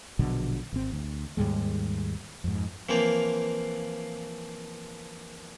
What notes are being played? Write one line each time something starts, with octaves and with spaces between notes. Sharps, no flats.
A#1 B2 D3 F#3
G#1 C4
D2
D#2 G#2 G3 G#3
F2 G#2
E3 F3 A#3 C4 F4